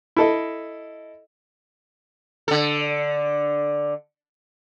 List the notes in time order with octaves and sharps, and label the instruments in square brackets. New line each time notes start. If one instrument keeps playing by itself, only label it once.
[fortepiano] E4 A4 D#5
[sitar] D3 A4